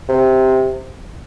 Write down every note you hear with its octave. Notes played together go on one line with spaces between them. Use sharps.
C3